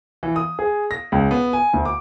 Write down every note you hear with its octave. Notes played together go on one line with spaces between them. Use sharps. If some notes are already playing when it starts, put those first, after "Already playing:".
E3
D#6
G#4
A#6
C#2
B3
G#5
D2
D6